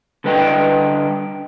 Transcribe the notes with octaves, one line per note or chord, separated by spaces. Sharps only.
D3 G3 B4 D#5 G5